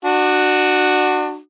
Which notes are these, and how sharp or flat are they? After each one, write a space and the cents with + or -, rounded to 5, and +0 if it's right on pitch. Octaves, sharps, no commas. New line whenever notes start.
D4 +30 F#4 +0